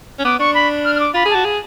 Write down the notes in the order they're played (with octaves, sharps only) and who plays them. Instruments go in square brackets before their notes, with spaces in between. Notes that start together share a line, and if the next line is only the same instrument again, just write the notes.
[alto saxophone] C#4
[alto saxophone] B3 [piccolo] D6
[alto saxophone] D4 [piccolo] C#6
[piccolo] B5
F6
F6
D6
[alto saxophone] F4 [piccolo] B5
[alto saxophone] G#4
[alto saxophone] F#4 [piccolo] A5
[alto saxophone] G#4